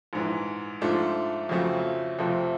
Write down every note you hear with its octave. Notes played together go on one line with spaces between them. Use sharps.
A#1 G#2 E3
G#2 F3 A3 D4
F2 C#3 F#3 A3 C4
F2 C3 F3 A3 C4